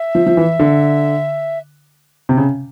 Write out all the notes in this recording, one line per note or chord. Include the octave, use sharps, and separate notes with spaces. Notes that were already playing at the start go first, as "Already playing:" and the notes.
Already playing: E5
F3
F3
E3
D3
C3
C#3